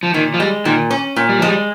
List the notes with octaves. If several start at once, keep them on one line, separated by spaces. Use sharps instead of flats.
F3
A#2 D#3
F3
G3 G#3
A#2 D#3
C#4
A#2
G3
F3 G#3
G3